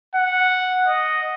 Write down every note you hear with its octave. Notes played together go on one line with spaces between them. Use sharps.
F#5
D#5